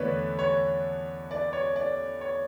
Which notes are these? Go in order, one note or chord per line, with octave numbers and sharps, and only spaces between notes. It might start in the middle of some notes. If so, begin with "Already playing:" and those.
Already playing: E2 D3 A3 B4 C#5 D5
C#5
D5
C#5
D5
C#5